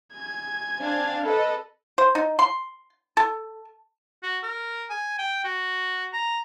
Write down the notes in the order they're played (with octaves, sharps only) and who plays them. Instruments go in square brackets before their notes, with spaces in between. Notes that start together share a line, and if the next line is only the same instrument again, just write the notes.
[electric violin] G#5 G#6
[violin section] C4 D4 F5
[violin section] A4 D#5 [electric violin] B4
[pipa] C5
D#4
C6
A4
[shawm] F#4
A#4
G#5
G5
F#4
A#5